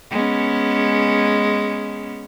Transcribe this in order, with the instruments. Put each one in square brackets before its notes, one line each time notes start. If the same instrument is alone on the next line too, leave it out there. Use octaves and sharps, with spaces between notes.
[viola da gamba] G#3 B3 C#4